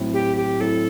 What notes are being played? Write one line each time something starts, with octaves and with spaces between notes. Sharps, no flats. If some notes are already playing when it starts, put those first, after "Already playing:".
Already playing: A2 F#3 C4 E4
G4
G4
A2 F#3 C4 E4 A4